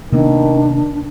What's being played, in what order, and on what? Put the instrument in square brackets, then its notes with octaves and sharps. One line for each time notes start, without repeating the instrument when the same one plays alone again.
[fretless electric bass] C3 A#3 B3 [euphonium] D#3 [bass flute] D4